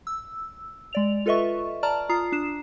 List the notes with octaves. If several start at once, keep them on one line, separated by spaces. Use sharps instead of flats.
E6
G#3 D5 F7
F4 A4 B4 D#5 E5 C#6
D5 A5 A#5 F6
F4 A#5 D#6 C7
D4 C7 E7